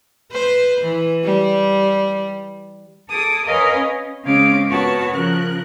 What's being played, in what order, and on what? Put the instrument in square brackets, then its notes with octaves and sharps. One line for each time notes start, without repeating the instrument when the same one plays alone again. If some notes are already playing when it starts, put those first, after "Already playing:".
[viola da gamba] B4 C5
E3
G3
[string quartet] G#4 A4 D6 D#6
A#4 B4 C#5 D#5 F5 G#5
C#4
C#3 G#3 C4 C#4 F5 D6
B3 F#4 A#4 C#5 A5
C#3 F3 A#4 F#6